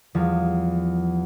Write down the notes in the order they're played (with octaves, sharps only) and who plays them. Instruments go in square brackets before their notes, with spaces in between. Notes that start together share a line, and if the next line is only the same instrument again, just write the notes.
[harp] E2 F3 G3